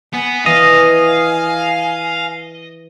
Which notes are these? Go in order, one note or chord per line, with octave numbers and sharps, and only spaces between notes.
B3 G#5
E3 D#5 F5 G#5